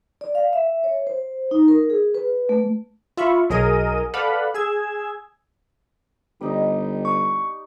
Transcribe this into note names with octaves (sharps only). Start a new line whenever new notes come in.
D5
F5
E5
C#5
C5
D#4
A#4
G#4
B4
A3
F4 E5 B5 C#6
B1 F#3 G#4 A#4 D#5 D#7
A4 B4 D5 F5 F#5 B5
G#4 E6 G#6
G1 G3 D#4 D#5
C#6